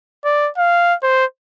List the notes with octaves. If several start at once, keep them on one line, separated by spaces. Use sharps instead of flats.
D5
F5
C5